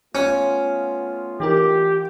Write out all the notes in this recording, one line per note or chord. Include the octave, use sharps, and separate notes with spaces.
A3 B3 C#4 F4
E3 D#4 G4 A#4